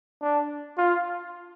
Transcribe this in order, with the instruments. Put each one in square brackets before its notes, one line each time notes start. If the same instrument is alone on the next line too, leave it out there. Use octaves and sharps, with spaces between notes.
[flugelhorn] D4
F4